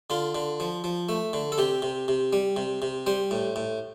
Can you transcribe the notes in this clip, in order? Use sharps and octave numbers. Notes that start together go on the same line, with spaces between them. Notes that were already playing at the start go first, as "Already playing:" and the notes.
D3 F4
D3
F3
F3
A3
D3
A4
C3 G4
C3
C3
G3
C3
C3
G3 C5
A2
A2